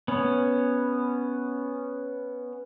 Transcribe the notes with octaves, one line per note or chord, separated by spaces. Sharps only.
B3 C#4